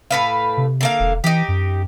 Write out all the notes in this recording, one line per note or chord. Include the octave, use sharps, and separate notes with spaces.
A2 B4 F5
C3
D3 A#3 F5
E1
E3 D#4 G4
F#2